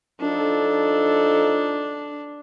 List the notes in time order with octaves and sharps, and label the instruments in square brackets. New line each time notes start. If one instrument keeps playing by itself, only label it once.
[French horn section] F3 D#4 A4 [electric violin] D4